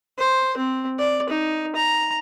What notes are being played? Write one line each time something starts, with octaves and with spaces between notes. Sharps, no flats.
C5
C4
D5
D#4
A#5